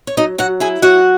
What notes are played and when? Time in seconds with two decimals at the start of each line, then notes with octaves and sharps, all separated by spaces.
0.07 C#5
0.17 F#3 D#4 D#5
0.38 F#3 F#4 F#5
0.60 E4 G#4 G#5
0.82 F#3 F#4 F#5